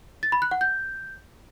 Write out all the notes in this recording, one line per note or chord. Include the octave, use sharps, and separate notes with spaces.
A6
B5
F#6
F#5
G6